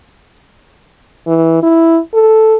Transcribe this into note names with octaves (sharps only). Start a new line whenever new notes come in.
E3
E4
A4